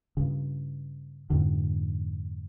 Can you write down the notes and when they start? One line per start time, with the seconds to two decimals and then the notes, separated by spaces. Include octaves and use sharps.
0.17 G2 C#3
1.30 F2 G#2 D3